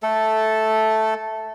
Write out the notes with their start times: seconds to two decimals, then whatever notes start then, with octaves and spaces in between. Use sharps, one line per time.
0.03 A3 A4